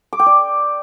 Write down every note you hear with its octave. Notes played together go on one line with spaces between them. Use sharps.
D6
G5
D5